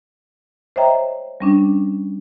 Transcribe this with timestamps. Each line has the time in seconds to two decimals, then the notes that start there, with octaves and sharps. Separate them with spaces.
0.76 C5 C#5 D#5 E5 G5 A#5
1.40 G3 C#4 D4